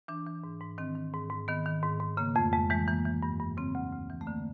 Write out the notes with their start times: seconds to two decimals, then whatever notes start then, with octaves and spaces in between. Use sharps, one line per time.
0.08 E3 D4
0.26 E3
0.44 G#2
0.61 G#2
0.78 D#3 C4
0.95 D#3
1.14 G#2
1.30 G#2
1.48 D#3 B3
1.66 D#3
1.83 G#2
2.00 G#2
2.17 C#3 A#3
2.36 F2 A3
2.53 F2 G#3
2.70 E3 G#3
2.88 E3 A#3
3.05 E3
3.23 G2
3.40 G2
3.57 C#3 C4
3.75 D2
3.92 D2
4.10 E3
4.21 A3
4.27 D3 A#3